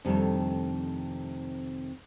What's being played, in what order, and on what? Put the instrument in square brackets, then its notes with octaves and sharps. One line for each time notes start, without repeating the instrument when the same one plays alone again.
[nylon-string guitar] F2 C3 D#3 G3 A3 D4